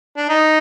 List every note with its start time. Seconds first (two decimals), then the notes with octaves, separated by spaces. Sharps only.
0.17 D4
0.29 D#4